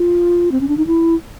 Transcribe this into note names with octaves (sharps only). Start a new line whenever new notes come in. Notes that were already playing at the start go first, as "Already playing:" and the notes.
Already playing: F4
C4
C#4
D4
D#4
E4